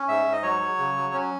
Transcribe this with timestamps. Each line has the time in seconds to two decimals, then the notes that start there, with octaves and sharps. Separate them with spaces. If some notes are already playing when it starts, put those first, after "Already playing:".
Already playing: C#4
0.08 G#2 E5
0.26 G#2
0.32 D#5
0.43 F#3 C#5
0.61 F#3
0.78 C#3
0.96 F#3
1.14 C#4